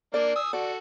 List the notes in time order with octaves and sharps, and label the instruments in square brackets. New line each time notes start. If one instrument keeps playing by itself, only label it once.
[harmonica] A#3 D4 A#4 [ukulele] D5
[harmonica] G#5 D#6 E6
[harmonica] F#4 A4 [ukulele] D5